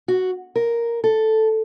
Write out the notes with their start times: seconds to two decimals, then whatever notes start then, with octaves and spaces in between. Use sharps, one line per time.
0.08 F#4
0.56 A#4
1.04 A4